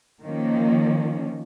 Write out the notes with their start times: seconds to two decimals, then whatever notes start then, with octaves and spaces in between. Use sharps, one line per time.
0.22 D#3 F3 A#3 C#4